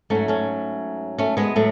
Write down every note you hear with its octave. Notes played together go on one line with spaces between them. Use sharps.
G#2 F#3 A3 C#4
A3 C#4
A3 C#4
G#3 B3
A2 F#3 A3